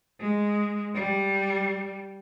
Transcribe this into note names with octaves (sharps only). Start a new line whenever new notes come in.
G#3
G3